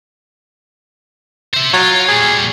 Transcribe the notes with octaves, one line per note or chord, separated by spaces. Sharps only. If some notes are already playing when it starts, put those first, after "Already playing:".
C5 E5
F#3 F4
A#2 G3 G#4